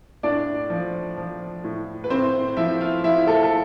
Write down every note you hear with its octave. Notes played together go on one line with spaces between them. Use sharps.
A2 D4 D5
F3
F3
A2
B4
A2 C4 C5
F3 E4 E5
F4 F5
F3 E4 E5
A3 A4
A4